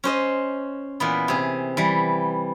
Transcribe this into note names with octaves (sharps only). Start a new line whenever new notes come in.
C#4 C5 D#5
A#2 E3 B3
C3 G#4
E3 G3